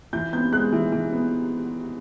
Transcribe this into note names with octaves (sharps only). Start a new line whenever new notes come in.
E3 G6
B3 G6
G#3 F#6
E3
E3
B3